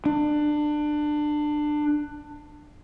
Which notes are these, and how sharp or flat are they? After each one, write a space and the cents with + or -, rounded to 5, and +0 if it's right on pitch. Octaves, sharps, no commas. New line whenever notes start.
D4 +25